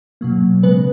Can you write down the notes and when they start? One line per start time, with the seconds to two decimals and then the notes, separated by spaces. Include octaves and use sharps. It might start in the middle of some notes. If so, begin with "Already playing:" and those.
0.21 B2 F#3 A#3
0.63 C#3 G#3 B3 B4